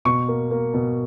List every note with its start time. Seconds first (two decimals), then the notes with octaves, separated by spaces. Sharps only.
0.05 B2 C#6
0.28 A#3
0.51 A#3
0.74 B2